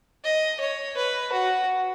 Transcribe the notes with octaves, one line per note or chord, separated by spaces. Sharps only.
D#5
C#5
B4
F#4